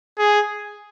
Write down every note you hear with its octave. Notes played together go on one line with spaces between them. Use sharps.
G#4